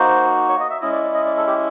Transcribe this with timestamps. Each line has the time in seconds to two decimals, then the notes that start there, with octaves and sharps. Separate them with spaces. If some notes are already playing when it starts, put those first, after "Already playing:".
Already playing: A#3 D#4 F#4 C5
0.49 C#5
0.60 D#5
0.70 E5
0.82 G#3 C#4 E4 D#5
0.92 D5
1.04 D5
1.14 D#5
1.25 D5
1.37 A4
1.47 G4